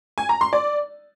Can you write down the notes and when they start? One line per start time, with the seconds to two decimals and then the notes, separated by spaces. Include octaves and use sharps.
0.18 G#5
0.29 A#5
0.41 C6
0.53 D5